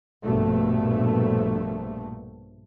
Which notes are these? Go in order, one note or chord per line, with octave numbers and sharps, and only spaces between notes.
A#1 G2 B2 A3